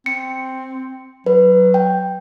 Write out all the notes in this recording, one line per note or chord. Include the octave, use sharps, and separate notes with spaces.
C4 C#7
F#3 B4
G5